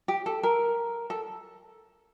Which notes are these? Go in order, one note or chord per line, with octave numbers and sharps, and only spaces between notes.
G4
A4
A#4
A4